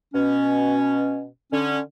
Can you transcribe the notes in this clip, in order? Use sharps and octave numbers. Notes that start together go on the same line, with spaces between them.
B2 C#4
D3 C#4